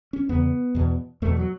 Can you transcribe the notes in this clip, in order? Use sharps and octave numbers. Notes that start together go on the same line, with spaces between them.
C#4
E2 C#3 B3
E2 B2
E2 B2 A3
F#3